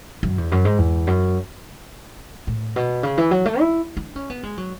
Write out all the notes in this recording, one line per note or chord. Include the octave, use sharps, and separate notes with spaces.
F#2
E2
F#2
G#2
E2
F#2
A2
B2
C#3
E3
F#3
A3
E4
D4
C#4
B3
G#3
F#3